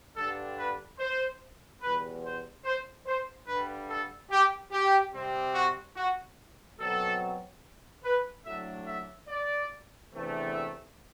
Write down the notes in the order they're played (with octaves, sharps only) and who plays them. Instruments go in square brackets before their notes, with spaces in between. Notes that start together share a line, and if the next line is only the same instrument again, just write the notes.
[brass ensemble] G2 D3 G3 D4 A4
B4
C5
E2 B2 G3 B4
C5
C5
C5
G2 D3 G3 B4
A4
G4
G4
C3 G3 C4
F#4
F#4
B2 F#3 C4 A4
B4
A2 F#3 A3 D4 E5
E5
D5
E2 C3 E3 A3 D4
E5